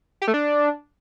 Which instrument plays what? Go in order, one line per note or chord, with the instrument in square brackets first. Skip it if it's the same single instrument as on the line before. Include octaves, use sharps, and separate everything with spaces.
[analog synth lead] G4
A3
D4